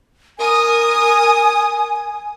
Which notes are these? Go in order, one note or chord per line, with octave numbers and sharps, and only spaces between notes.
A#4 G#5 D#6